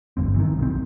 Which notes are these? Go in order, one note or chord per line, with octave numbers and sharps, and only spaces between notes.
G1 G2 C4
D#3 E3
B1 C4